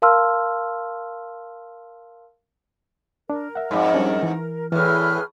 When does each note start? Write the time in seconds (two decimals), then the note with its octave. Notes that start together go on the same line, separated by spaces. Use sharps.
0.02 A#4 F5 A5 C6 E6 F6
3.30 D4 A#4
3.55 E5 F#5
3.71 F2 G#2 D5 B5 C6
3.94 G3 C#4 D4
4.22 E3
4.72 E2 A2 E3 G#4 B4 F6